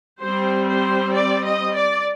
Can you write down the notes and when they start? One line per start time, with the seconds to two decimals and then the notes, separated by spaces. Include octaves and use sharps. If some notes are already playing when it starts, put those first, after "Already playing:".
0.20 G3 C4 C5
0.67 C5
1.13 D5
1.44 D#5
1.75 D5